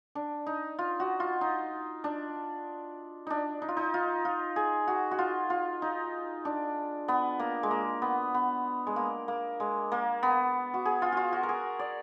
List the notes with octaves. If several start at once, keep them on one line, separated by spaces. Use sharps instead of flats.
D4
D#4
F4
F#4
F4
D#4
D4
D4 D#4
D#4
F4
D#4
F4
F4
G#4
F#4
F#4
F4
F4
D#4
D4
B3
A#3
G#3
A#3
B3
B3
G#3
A#3
A#3
G#3
A#3
B3
F#4
G#4
F4
F4 F#4
F#4
A#4
G#4
D5